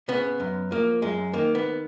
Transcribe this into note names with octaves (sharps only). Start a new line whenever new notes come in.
C#3 B3
F#2
F3 A#3
F#2 G#3
D#3 A#3
B3